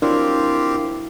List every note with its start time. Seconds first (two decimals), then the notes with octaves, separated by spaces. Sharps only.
0.02 F#3 C4 D4 E4 F4 G4 A#4